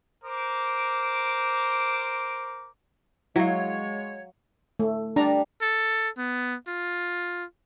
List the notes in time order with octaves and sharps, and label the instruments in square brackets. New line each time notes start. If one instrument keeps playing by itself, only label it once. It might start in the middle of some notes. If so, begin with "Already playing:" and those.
[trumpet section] A#4 C5 D6
[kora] F#3 [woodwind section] G#3 C#5 [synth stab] E4 [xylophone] F5 G#6
[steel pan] A3
[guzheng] G3 [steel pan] D4 A#5
[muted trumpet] A4
B3
F4